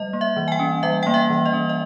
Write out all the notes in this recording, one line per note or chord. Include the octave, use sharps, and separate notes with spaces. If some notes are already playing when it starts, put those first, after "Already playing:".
Already playing: G3 D#5
A#3
E5
E3
G#5
G5
C#4
G3 E5
A#3 G5
E5
E3
D#5
C#4
D#5